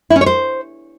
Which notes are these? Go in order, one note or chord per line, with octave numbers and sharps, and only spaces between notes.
E4
C#4
C#5
C5